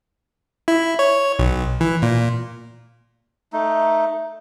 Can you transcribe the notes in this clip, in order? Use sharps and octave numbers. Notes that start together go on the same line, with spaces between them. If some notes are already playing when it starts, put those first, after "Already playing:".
E4
C#5
B1
E3
A#2
A3 D#4